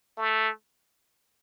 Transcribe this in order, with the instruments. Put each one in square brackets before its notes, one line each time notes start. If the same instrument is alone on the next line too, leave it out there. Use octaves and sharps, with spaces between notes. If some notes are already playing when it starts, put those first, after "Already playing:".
[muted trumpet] A3